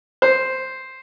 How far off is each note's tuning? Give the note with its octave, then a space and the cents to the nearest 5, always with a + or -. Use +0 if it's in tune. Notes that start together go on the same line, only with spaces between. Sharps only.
C5 +0